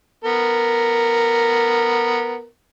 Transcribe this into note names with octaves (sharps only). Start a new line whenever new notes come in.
B3 A#4